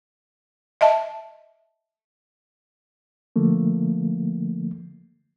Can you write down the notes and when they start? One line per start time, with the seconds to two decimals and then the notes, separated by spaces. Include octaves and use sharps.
0.81 D#5 E5 A5
3.36 D3 F3 A3 A#3